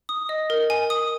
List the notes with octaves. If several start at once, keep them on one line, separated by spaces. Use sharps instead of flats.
D#6
D#5
A#4
G#5
D#6